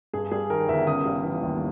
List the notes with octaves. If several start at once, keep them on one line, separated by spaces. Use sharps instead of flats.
G2 G#4
G3 G#4
D#3 A#4
G1 E5
C#3 D#6
G3
E3
D#2